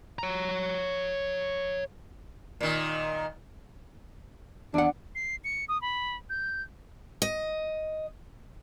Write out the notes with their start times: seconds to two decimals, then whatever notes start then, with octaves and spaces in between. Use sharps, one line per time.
0.19 C#5 A#5
2.61 A#2 D#3
4.74 E2 D4 F#5
5.15 C7
5.44 C#7
5.69 D#6
5.82 B5
6.30 G6
7.22 D#5